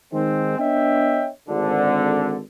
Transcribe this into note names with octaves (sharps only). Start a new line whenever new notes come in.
D#3 G#3 C4
B3 D4 C#5 D#5 E5 G5
G#1 D3